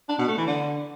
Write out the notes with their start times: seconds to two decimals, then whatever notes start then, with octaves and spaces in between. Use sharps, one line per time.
0.09 D4
0.19 B2
0.28 A3
0.38 E3
0.47 D3